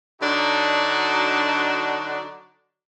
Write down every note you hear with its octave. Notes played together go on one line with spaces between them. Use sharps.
D3 F#3 D4 D#4 F#4